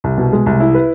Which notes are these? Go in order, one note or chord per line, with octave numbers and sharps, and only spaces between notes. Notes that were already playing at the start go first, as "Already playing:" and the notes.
C2
B2
G#3
C2
E4
B4